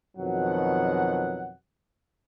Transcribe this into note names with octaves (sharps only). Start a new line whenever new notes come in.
F2 B2 D#3 F#3 F#5